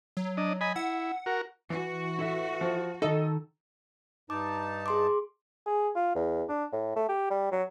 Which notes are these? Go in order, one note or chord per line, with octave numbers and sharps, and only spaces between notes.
F#3
D4 D#5
D#5 G#5 B5
E4 F#5
F#4 A#4
E3 F#4
E4 A4 E5
F3
D#3 D#4 A4 D#5
G2 D#4 A5 D6
G#4 C6 D6
G#4
F4
E2
D4
A2
A3
G4
G3
F#3